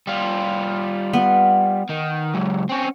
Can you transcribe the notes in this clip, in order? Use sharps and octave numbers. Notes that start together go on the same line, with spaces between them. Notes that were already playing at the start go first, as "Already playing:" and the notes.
G3 F4
B3
D#3
C#2 F#2
C4 C#4